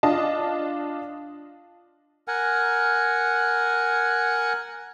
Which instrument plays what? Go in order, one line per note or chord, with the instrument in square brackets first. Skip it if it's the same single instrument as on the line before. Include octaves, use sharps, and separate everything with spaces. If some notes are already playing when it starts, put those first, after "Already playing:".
[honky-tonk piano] D4 F4 D#5 A5
[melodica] A#4 F#5 G#5